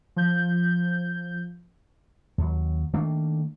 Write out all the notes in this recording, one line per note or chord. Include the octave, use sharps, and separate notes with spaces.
F3 G6
D#2 F#3
D#3 A3 A#3 D4